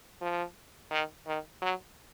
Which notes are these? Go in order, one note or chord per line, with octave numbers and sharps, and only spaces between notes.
F3
D#3
D#3
F#3